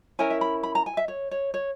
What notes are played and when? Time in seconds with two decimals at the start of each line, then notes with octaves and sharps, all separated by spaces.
0.19 C#4 E4 A#4 G#5
0.30 E5
0.41 B5
0.63 B5
0.75 A#5
0.86 G#5
0.97 E5
1.08 C#5
1.31 C#5
1.54 C#5